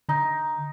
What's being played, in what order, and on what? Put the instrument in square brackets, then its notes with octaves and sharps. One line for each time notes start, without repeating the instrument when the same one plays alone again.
[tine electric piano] D3 [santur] D#4